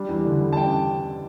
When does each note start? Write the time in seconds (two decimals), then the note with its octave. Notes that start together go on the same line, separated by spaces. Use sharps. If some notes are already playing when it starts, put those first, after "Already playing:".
Already playing: G3 D4
0.09 E2
0.25 D3
0.40 G3
0.53 A5
0.57 D4 G5